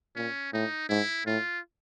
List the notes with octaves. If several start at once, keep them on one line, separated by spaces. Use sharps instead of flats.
A#2 C#4
A2 D#4
G#2 E4
A2 F4